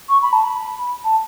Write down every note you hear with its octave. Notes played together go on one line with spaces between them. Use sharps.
C#6
B5
A5
B5
A5